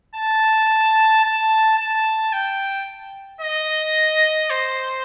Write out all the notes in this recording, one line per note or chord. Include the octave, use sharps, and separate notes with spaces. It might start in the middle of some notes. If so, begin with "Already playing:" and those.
A5
A5
A5
G5
D#5
C5